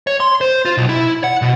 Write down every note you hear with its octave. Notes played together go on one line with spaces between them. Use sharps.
C#5
C6
C5
F4
B1
E4
F#5
B2